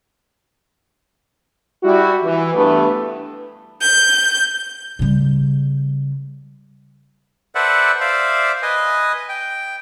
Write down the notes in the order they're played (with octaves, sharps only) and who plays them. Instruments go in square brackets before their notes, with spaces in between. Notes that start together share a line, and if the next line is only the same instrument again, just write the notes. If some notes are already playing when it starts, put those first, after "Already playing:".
[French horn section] G3 E4 F#4
E3
G2 A3 B3
[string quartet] G6
[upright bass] C#3 G3
[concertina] A4 B4 C5 D5 E5 F#5
C5 D5 E5 F5
B4 D#5 G#5 D#6
G5